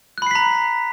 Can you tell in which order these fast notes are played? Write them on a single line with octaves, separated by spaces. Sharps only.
F#6 B5 C7 B6 A#5